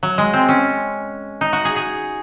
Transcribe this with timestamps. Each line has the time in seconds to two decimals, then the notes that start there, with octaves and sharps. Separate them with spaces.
0.03 F#3
0.18 G#3
0.33 C4
0.49 C#4
1.41 D#4
1.53 F#4
1.65 G#4
1.76 G#4